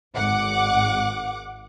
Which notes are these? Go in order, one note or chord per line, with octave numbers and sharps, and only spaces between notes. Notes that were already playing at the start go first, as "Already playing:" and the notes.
G#1 F#5 D6